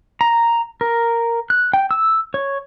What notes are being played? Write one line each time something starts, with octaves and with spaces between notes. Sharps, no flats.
A#5
A#4
F#6
G5
E6
C#5